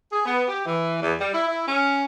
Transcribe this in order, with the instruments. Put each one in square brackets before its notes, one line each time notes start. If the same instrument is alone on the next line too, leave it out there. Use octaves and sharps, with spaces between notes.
[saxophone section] G#4
B3
G4
E3
E2
G3
E4
E4
C#4